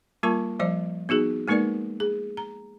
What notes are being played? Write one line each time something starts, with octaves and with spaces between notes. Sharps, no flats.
G3 A#3 F4 A#4 A5 C#6
F3 G3 C5 D5
B3 D#4 F#4 G#4
G#3 A#3 D#4 A#4 B4 D5
G#4
A#5